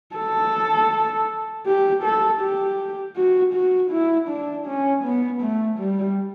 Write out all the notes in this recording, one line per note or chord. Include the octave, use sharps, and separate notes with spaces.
A4
G4
A4
G4
F#4
F#4
E4
D4
C#4
B3
A3
G3